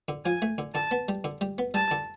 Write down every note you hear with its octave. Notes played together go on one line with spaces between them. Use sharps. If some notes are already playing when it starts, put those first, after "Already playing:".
D3
F3 G#5
A3
D3
D3 A5
B3
G3
D3
G3
B3
G3 A5
D3